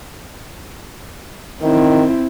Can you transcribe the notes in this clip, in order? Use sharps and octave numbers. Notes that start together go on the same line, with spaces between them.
D#3 C4 E4